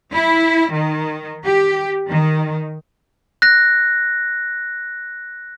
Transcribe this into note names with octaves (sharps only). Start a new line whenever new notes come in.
E4
D#3
G4
D#3
F#6 A#6